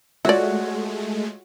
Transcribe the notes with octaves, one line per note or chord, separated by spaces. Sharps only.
G#3 A3 F4 F#4 C#5 D5 E5